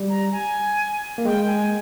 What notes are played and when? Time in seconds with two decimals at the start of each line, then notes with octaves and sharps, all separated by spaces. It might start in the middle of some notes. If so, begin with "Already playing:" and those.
Already playing: G3
0.09 A#5
0.32 G#5
1.18 A#3
1.25 G#3 G5
1.47 G#5